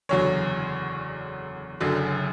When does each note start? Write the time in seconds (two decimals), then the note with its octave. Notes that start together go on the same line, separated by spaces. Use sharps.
0.09 F#1 E2 D3 F#3 C#5
1.80 F#1 F#2 D3 F#3